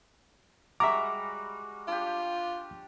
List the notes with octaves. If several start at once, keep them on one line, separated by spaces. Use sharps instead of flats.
G3 G#3 F#4 E5 A#5 D6
D4 F4 G4